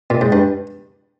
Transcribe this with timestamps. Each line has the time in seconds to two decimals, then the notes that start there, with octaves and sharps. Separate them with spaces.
0.10 A#2
0.21 G#2
0.32 G2